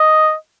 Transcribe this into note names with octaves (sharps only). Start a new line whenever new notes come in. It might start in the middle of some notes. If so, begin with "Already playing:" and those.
Already playing: D#5